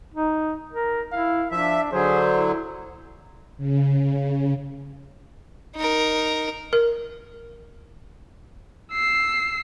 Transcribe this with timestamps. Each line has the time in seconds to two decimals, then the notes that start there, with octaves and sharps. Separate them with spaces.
0.14 D#4
0.73 A#4
1.12 E4 F5
1.51 F3 D4 E5
1.92 D3 F#3 G#4 C5
2.32 E4
3.58 C#3
5.76 D#4 A#4
6.73 A#4
8.92 E6 C7